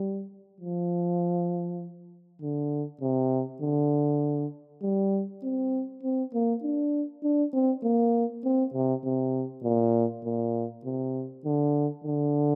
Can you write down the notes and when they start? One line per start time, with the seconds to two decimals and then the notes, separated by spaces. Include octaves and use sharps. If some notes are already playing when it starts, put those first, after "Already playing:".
Already playing: G3
0.61 F3
2.42 D3
3.01 C3
3.61 D3
4.82 G3
5.43 C4
6.03 C4
6.33 A#3
6.63 D4
7.23 D4
7.53 C4
7.83 A#3
8.44 C4
8.74 C3
9.04 C3
9.63 A#2
10.25 A#2
10.85 C3
11.45 D3
12.04 D3